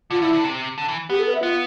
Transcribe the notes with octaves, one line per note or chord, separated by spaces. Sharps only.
D3 F4
D3 E4
D3
C3
D3
E3
B3 G4
A4
B4
E5
B3 F4